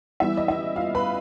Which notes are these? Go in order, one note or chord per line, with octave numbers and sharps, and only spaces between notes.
E3 G3 B3 E4 E5
D#5
E4 E5
F4 F5
B4 B5